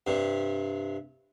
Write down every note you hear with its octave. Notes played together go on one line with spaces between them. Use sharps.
G2 C3